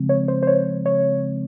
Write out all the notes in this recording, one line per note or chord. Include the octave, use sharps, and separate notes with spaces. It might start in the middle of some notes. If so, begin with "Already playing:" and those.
Already playing: C#3 F3 G#3 C4
C#5
C5
C5
C#5
C#5